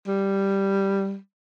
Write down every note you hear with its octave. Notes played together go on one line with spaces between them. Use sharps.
G3